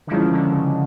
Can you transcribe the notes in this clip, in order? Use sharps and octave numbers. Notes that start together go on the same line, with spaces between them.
D3
D#3 F3 G#3 C#4 E4
D3
C#3